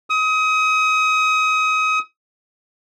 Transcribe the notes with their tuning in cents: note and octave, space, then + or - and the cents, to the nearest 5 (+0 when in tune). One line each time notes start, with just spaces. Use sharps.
D#6 +30